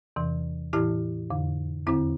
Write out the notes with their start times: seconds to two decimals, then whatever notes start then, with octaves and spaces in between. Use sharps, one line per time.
0.16 E2 C3 E3
0.73 A2 E3 E4 G4
1.30 F2 D3
1.87 E2 D3 C4 E4